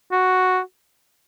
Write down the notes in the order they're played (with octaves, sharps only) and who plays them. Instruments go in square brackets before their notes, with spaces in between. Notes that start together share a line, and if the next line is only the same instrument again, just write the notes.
[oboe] F#4